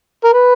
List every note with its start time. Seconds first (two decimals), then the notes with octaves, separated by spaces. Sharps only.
0.24 A#4
0.33 B4